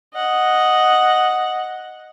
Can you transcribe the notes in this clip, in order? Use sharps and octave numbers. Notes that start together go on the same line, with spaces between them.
D#5 F#5